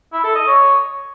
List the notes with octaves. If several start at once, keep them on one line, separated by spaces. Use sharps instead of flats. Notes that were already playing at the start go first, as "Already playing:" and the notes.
E4
A4
D#5
C#5